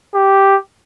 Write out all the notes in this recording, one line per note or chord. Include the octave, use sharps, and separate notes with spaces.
G4